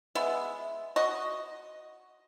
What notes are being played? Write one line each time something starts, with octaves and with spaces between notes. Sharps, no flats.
G#3 B3 E5
F#4 D#5